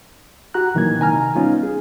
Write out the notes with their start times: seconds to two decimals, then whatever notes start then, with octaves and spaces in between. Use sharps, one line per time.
0.54 F#4 G4 A#5 F#6
0.75 A#2 D#3 E3 F#3 A#3 G#6
0.99 C3 D#3 G#5 A#5 F6
1.35 G3 B3 C#4 D#4 F4
1.63 G#4